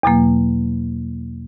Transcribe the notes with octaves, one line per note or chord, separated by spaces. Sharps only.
E2 B2 F#3 A#3